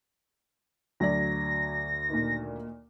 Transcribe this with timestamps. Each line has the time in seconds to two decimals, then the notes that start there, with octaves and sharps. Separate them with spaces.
1.00 D2 F#3 D5 A#6
2.10 A#2 D#3